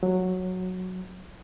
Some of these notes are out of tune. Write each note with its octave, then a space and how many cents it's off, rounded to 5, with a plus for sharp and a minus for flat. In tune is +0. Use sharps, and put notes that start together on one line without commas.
F#3 -10